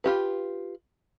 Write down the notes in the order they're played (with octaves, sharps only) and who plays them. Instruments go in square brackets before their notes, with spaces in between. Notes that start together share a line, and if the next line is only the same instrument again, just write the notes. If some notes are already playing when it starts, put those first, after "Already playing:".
[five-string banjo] F4 G4 B4